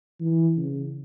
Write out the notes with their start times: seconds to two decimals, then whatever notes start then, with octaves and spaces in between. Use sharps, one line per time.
0.20 E3
0.57 C#3